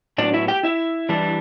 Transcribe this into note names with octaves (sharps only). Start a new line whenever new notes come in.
A2 F#3 B3 D4 D5
E4 E5
G4 G5
E4 E5
E3 G3 D4